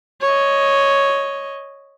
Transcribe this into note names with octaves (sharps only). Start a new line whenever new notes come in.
C#5 D#5